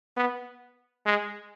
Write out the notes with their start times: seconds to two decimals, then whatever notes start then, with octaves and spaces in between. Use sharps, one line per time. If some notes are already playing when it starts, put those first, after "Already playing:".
0.17 B3
1.06 G#3